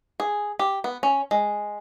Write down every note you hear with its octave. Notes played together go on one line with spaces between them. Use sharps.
G#4
G4
B3
C#4
G#3